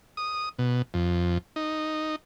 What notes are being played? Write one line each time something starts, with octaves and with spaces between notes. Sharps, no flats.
D#6
B2
F2
D#4